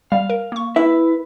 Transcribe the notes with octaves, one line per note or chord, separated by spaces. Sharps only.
G3 F5
A#4
A#3 C#6
E4 B4 E5